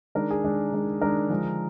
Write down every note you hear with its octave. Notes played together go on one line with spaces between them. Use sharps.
D#3 G#3 D4 A#4
G#4
D#3 G#3 D4
D#3 G#3 D4
D#3 G#3 D4 A#4
D3 F3 G#3